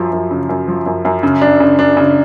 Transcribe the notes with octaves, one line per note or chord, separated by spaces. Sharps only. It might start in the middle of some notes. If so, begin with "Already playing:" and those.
Already playing: F#2 F3
F#2
C#3
F#2
F3
F#2
F#2
C#3
D4
C#3
D4
C#3